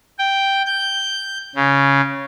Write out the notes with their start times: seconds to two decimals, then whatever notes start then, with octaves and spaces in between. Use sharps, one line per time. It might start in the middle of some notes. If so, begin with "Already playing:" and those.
0.19 G5
0.66 G6
1.56 C#3